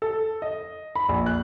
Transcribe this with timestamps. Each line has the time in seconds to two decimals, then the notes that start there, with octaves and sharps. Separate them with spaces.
0.02 A4
0.42 D#5
0.95 B5
1.09 A#1
1.26 F#6